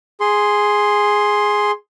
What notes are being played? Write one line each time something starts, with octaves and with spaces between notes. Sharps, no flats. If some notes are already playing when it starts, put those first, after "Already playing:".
G#4 C6